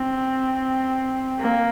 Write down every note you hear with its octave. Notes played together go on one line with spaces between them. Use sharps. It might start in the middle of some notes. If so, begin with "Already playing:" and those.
Already playing: C4
A#3